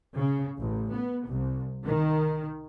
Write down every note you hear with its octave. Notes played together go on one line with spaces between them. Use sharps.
C#3
A1
B3
C2
D#3